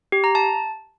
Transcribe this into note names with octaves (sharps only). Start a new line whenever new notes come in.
G4
A#5
A5